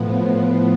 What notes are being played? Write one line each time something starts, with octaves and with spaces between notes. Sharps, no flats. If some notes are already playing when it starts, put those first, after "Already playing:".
Already playing: A2 F3 B3